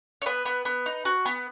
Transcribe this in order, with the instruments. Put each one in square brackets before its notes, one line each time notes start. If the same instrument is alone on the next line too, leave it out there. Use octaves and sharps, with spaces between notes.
[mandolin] C#5
B3 B4
B3
B3
D#4
F#4
B3